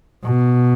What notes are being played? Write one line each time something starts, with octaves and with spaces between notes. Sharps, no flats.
B2